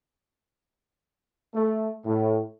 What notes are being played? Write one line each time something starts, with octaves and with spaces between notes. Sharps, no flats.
A3
A2